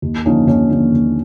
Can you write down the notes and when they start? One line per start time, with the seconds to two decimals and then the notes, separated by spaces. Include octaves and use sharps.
0.02 D#2
0.25 D3 F3 A#3 C#4 D#4
0.47 D#2 C#4 D#4
0.70 D3 F3 A#3
0.92 D#2